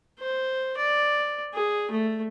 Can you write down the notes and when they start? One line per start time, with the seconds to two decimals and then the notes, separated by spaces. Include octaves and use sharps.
0.19 C5
0.77 D5
1.54 G#4
1.91 A3